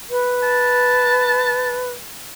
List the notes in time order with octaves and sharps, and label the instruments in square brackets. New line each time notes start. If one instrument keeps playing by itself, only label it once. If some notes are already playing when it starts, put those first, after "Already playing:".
[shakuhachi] B4
[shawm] A5